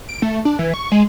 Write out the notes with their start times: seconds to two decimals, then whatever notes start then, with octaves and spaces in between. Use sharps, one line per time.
0.09 D7
0.22 A3
0.45 D4
0.59 E3
0.74 C#6
0.92 G#3